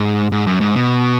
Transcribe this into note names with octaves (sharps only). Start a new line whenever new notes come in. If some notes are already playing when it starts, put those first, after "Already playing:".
Already playing: G#2
G#2
F#2
G#2
B2